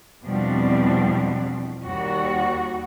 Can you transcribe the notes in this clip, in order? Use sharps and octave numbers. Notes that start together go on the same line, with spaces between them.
E2 B2 F3 G3 C4 D4
D#2 G3 F#4